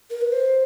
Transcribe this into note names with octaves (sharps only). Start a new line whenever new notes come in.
A#4
B4
C5